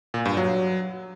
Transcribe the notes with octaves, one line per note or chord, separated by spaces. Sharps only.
A#2
G2
F#3